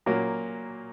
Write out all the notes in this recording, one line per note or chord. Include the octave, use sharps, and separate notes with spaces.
A#2 F#3 A#3 C#4